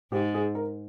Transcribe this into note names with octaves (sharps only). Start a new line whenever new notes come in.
G#2 G4
G#4
A#4